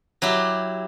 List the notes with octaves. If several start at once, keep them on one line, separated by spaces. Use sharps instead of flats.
F#3 E4 G4